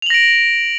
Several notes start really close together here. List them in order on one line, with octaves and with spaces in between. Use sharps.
F7 F#7 A#6 D7